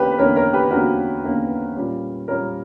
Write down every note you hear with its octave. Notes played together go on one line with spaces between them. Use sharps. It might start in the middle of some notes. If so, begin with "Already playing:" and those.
Already playing: E2 D3 A#3 C#4 G4 B4
B4
E2 D3 A#3 C#4 A#4 C#5
A#4 C#5
G4 B4
E2 D3 A#3 C#4 F#4 A#4
E2 D3 A#3 C#4
A#2 G3 C#4
A#2 G3 C#4 A#4 C#5